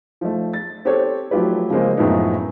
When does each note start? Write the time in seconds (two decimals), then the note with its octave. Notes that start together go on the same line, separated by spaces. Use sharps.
0.21 F3 A3
0.54 A6
0.85 C4 G4 A4 C5 C#5
1.31 F3 F#3 A3 F4 G4 B4
1.70 C#3 F3 G#3 A#3 C4
1.97 F#2 A2 F3 G#3 B3 D#4